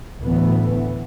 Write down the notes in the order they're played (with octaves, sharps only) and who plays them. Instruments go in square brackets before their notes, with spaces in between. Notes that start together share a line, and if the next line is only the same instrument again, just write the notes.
[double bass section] D2 A2 E3 B3